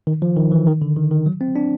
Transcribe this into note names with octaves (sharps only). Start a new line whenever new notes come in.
D#3
F3
D#3
E3
D#3
D3
D#3
D#3
F#3
C4
D4